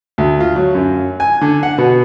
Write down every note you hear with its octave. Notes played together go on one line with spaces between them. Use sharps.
D2
F4
F#3
F#2
G#5
D3
F#5
B2